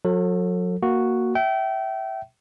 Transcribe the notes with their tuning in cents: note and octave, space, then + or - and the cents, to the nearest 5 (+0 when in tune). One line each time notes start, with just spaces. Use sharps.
F#3 -35 A4 +25
A#3 +0 F#4 +0
E5 +0 G5 -30